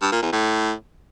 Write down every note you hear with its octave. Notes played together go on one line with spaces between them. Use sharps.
G2
A#2
E2
A2